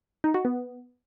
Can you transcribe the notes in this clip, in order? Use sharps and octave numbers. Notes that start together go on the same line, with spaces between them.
D#4
F#4
B3